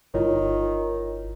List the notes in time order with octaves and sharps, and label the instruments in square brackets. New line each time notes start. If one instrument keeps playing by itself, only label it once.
[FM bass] G1 [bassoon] D#3 [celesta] E4 F4 C#5